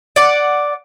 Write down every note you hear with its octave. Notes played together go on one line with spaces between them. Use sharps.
D5 F#5